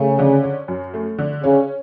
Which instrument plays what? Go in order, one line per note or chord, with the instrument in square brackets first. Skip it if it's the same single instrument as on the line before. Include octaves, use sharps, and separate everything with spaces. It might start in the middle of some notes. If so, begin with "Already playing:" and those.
Already playing: [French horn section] C#3 [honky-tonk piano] A3
[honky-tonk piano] D3
C#4
F#2
A3
D3
[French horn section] C#3 [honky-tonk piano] C#4